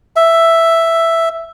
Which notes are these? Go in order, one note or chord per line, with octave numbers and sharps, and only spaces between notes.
E5